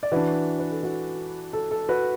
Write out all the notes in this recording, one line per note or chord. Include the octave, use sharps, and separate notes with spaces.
D5
E3 D4 F#4 B4
B4
A4
F#4
A4
A4
F#4 B4